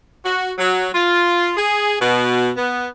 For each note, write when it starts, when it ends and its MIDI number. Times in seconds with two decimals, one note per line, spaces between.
0.24 0.52 66
0.58 0.88 54
0.93 1.50 65
1.57 1.96 68
1.99 2.49 47
2.56 2.86 59